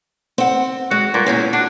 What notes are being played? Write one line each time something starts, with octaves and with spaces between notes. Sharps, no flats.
C4 F#5
G#3 F#4
G2 A#2
E2 A#2 C#4 G#4
D4 F#4